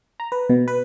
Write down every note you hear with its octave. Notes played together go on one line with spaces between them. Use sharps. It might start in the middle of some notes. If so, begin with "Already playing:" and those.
A#5
B4
B2
B4